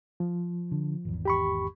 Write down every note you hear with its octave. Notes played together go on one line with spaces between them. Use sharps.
F3
D3
G#1 E2
G4 B5 C#6